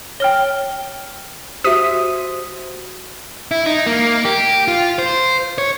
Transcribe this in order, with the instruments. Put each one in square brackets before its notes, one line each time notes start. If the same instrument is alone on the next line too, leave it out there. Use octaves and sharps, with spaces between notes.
[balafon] C#5 [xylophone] G5 F6 G7
[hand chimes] F#4 C5 [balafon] G4 E5 [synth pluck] D#6 B6 D#7
[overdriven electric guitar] E4
D#4
A#3
G4
F4
C5
C#5